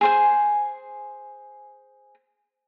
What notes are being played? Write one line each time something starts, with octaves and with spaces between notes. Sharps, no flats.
G#4 C5 G#5